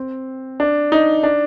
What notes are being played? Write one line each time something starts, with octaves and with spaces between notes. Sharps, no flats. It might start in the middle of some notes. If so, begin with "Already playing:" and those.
Already playing: C4
D4
D#4
D4